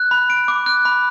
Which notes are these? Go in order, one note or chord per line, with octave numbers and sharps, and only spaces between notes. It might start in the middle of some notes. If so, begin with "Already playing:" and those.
Already playing: F#6
B5
D7
D6
F#6
B5